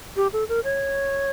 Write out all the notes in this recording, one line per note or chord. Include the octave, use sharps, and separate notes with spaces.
G4
A4
A#4
C#5